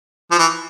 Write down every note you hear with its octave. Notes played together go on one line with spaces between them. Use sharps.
F3
E3